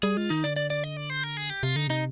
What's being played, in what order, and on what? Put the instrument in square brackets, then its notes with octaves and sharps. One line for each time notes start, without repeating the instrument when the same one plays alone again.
[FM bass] G3 [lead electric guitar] G#4
[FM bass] G#3 [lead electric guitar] F4
[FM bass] D#3 [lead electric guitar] D#4
[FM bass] D3 [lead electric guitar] D5
[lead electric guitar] D5
D5
D#5
D5
C5
A#4
G#4
G4
[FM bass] C3 [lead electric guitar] F4
[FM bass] D3 [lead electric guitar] D#4
[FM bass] C3 [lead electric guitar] D#4